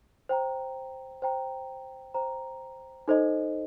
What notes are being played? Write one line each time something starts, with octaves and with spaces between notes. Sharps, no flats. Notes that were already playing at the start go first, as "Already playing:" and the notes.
C5 G5 A#5
C5 G5 A#5
C5 G5 A#5
D#4 A4 C5 D#5